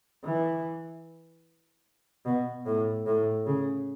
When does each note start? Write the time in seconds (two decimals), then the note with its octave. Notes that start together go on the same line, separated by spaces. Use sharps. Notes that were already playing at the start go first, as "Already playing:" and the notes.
0.24 E3
2.25 B2
2.66 A2
3.06 A2
3.46 C#3